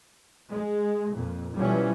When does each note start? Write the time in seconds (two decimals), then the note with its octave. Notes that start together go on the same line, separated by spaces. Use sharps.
0.51 G#3
1.15 F2 A#2
1.57 B1 E3 F3 G3 C#4